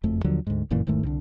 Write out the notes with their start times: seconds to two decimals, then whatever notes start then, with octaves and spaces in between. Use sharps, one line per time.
0.03 F#1 F2 A3
0.24 D#2 D3 F3 F#3
0.47 D2 G#2
0.71 G1 F#2 A#2 E3
0.87 E1 G#2 D#3 A3
1.03 C2 D3